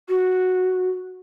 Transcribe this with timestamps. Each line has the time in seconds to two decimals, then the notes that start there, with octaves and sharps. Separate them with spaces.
0.09 F#4